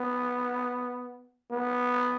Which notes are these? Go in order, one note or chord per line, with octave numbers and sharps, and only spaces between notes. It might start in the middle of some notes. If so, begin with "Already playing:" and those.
Already playing: B3
B3